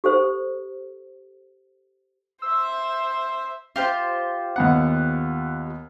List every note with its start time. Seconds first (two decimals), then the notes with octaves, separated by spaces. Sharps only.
0.04 G4 A4 C5
2.42 C5 E5 E6
3.76 F4 G4 C5
4.56 D#2 B3 F#5